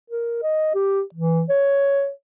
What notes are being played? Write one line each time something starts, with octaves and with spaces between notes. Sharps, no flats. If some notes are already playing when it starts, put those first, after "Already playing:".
A#4
D#5
G4
E3
C#5